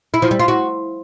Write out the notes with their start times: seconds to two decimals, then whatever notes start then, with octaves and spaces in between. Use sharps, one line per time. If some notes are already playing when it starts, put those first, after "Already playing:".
0.14 E4
0.22 F3
0.31 G3
0.40 F4
0.48 F#4